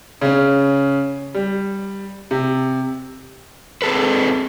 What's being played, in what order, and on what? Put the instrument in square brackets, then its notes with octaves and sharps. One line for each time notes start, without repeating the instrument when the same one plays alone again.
[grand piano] C#3 C#4
G3
C3
[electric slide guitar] C4 G#4 A4 B4